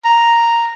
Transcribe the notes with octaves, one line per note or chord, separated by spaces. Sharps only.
A#5